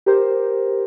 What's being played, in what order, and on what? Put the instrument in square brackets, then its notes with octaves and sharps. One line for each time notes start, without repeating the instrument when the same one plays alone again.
[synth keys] G4 A#4 C5